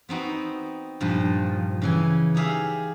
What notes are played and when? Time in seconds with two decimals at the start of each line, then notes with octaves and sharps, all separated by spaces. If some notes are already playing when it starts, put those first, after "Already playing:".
0.09 B3 C4 D#4 F#4
1.01 G2 A#2 F3
1.82 C#3 E3 G#5
2.35 D#4 G4 G#4 E5 F5